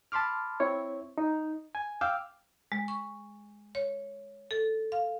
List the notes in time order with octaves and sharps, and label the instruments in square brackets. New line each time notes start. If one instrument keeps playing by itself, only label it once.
[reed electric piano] A5 B5 C6 D6 F6
C4 E4 C#5
D#4
G#5
F5 G5 D6 E6 F6
[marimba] G#3
C#6
C#5
A4
F5